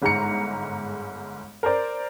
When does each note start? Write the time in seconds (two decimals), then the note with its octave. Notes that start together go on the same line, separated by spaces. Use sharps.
0.02 G1 G#2 G#3 A#5 C#7
1.63 A#4 C5 D5